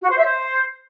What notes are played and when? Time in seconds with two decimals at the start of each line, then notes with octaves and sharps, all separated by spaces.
0.02 F#4
0.09 C5
0.16 E5
0.24 C5